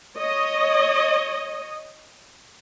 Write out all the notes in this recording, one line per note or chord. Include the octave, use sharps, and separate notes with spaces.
C#5 D#5